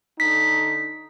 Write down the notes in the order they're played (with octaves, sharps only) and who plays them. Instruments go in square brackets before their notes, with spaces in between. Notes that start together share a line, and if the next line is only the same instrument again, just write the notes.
[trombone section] D3 D#4 [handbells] B6